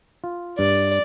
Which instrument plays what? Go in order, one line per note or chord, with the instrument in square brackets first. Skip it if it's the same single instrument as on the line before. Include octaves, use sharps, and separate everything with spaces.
[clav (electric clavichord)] F4
[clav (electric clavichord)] G2 [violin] D5